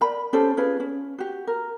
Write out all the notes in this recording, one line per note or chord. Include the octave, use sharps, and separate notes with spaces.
A#4 D5 B5
C#4 G4 A4 C5
C#4 F4 G#4 B4
C#4
F#4 G4
A#4